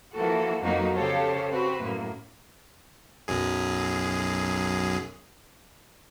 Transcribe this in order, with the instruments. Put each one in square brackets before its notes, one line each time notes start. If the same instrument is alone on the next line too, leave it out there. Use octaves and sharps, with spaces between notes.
[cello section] E3 F3 A#3 F#4 A4
F2 F#3 A#3 B3 D#4 F#4
C#3 G4 A4 C5 C#5 F5
C4 F#4 B4
F#2 A2 A#3
[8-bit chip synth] B1 F#2 G#4